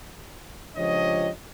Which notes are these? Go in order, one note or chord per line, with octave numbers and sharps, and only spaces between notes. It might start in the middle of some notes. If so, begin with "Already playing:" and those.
C#2 F3 D4 G4 C#5 D#5